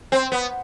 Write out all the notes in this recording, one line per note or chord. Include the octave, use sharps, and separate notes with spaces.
C4
B3